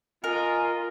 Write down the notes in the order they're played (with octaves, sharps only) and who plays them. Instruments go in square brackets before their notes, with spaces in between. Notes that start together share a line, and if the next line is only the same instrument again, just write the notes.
[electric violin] F4 [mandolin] A#4 [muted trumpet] D#5 [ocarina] G#5